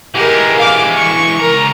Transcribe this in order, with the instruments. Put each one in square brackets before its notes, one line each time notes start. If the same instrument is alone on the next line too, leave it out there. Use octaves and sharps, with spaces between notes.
[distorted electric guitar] E3 G#3 [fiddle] G4 A#4
[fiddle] F5 D6
C#6
[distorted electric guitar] C#2 A#5 [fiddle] A#4